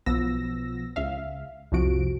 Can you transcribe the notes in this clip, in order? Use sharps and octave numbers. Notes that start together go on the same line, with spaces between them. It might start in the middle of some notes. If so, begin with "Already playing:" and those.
B1 F3 B3 E6 A#6
C#2 E5 F5
C2 F2 C3 F3 F#4 D7